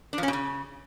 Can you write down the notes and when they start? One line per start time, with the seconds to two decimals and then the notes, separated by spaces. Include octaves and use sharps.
0.13 D4
0.18 F3
0.23 C#4
0.28 B2
0.33 C#3